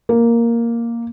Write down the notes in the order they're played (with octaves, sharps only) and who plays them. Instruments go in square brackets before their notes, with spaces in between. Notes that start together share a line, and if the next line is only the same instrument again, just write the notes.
[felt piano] A#3